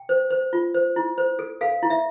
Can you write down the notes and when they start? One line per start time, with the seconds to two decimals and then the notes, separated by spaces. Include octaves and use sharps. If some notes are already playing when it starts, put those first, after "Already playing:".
Already playing: G5
0.09 C5
0.31 C5
0.53 F4
0.74 C5
0.96 E4
1.18 C5
1.39 A4
1.61 A4 F5
1.83 E4
1.90 E5